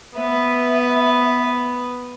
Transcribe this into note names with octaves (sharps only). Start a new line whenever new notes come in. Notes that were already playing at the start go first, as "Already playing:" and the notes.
B3 B4 E5